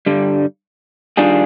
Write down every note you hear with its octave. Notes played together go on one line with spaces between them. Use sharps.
G2 D3 G3
D#3 G3 D4 F4 G#4